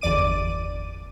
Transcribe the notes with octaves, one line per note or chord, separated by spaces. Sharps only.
G1 E2 D5 D6 D#7